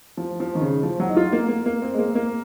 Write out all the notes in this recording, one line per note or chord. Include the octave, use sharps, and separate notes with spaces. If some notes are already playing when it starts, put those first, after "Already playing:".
F3
F3
D#3
C#3
F3
F#3
D#4
F4
A#3
A#3
A#3
C4
G#3
A#3
A#3